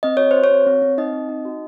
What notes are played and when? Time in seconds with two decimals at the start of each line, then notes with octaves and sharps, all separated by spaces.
0.03 C4 D#5
0.17 F#4 C#5
0.31 F#4 C5
0.44 C#5
0.51 C4
0.66 C4
0.82 C4
0.98 D#4 D#5
1.13 C4
1.29 D#4
1.45 F#4